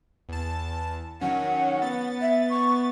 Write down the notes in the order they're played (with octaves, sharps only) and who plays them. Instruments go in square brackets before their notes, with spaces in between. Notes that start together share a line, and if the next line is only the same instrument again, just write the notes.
[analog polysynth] E2 A5
[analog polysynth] D#3 F#3 C#4 [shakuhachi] F#5
[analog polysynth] B3 A6
[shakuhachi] E5
C#6